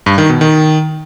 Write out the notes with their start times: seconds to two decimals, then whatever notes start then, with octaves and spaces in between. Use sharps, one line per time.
0.06 G2
0.18 D#3
0.29 B2
0.41 D#3